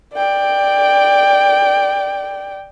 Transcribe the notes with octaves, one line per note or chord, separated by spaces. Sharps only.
D5 G5